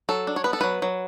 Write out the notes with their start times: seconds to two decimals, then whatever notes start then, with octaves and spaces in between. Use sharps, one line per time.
0.09 F#3 A4
0.27 D4
0.36 C#5
0.44 B3 B4
0.53 A4
0.61 F#3 B4
0.82 F#3